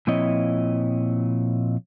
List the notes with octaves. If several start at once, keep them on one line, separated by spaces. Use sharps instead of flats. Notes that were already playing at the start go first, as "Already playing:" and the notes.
A#2 F3 C4 E4 C#5 D#5